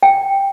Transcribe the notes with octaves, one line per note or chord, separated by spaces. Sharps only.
G5